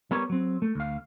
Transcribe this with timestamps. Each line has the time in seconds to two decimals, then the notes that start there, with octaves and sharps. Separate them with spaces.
0.11 G3 B3 A#4 C#5
0.30 F#3 C4
0.62 A3
0.75 D2 F5